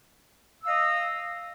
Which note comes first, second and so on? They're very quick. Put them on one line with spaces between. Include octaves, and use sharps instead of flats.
E6 F5 D#5